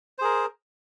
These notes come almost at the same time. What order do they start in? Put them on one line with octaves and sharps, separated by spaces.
C5 G#4 A#4